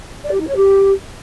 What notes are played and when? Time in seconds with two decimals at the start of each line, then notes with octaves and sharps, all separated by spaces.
0.23 D5
0.31 G4
0.40 D#4
0.48 C#5
0.56 G4